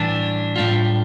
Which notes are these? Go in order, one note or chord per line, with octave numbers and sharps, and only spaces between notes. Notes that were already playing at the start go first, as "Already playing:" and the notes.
Already playing: A2 E3 G3 D4
A2 G3 D4 F4